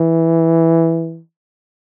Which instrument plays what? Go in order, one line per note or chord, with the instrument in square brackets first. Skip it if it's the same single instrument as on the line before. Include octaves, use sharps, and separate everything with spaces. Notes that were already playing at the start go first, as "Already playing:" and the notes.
Already playing: [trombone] E3